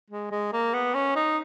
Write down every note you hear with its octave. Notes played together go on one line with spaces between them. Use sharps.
G#3
G#3
A#3
B3
C#4
D#4